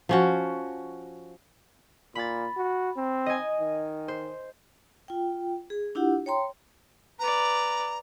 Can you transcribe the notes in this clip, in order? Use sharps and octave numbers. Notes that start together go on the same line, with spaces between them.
F3 C#4 F#4
A#2 B5 A6
F#4
C4
D#5 G#5
D#3
C5
F4 G5
G#4
D4 E4 F4 G4 F#5
C#5 G5 A#5 C6
B4 D5 A#5